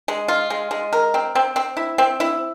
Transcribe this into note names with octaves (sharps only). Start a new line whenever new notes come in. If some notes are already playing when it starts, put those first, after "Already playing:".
G#3
F4
G#3
G#3
A#4
C4
C4
C4
E4
C4
E4